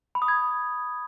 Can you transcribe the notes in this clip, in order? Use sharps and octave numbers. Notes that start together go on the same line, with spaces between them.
B5
D#6
G#6